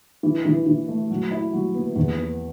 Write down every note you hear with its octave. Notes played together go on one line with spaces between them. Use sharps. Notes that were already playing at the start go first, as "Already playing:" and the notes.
E3
E3
E3
A3
F#3
E4
F#3
B3
E2
B3